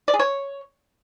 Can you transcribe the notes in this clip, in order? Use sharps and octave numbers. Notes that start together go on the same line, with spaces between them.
D5
G#4
C#5